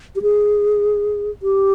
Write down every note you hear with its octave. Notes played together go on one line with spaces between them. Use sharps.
G4
G#4
G4